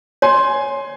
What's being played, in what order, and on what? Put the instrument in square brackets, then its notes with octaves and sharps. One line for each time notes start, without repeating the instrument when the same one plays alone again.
[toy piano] C#5 [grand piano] G#5 C6